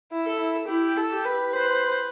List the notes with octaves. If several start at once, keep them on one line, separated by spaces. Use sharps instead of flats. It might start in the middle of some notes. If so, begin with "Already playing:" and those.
E4
A4
E4
E4 G4
A4
G4
B4
B4 C5